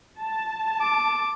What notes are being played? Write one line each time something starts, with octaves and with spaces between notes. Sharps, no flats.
A5
D6